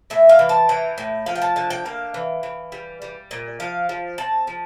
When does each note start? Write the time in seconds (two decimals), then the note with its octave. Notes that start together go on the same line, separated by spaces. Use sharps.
0.10 A2 E5
0.29 F5
0.39 E3
0.49 A5
0.69 E3 G5
0.98 A2
1.26 F3 F5
1.36 G5
1.42 A5
1.56 D3 A5
1.70 G5
1.85 A#3 F5
2.14 E3
2.43 E3
2.72 G3
3.02 G3
3.31 A#2
3.60 F3 F5
3.89 F3
4.18 C4 A5
4.47 F3